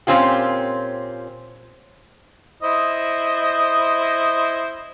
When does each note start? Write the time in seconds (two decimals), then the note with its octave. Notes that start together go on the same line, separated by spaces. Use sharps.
0.07 A#2 C4 C#4 F4 G4
2.63 E4 C5 D#5